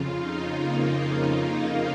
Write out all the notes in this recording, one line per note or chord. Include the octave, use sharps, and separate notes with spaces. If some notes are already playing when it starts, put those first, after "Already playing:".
Already playing: F2 C#3 F4
D#4
A#3